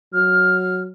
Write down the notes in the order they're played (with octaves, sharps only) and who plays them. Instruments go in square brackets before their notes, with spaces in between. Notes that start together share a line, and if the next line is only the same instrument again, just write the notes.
[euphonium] F#3 [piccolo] F6